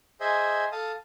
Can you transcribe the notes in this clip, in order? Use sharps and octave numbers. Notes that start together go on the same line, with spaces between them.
G#4 C5 D#5 E5 G#5
A4 F5 A5 D#6